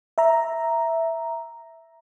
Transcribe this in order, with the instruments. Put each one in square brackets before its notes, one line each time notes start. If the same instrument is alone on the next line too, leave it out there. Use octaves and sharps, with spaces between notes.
[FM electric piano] E5 A#5